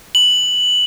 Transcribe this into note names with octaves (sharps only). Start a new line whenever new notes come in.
F#7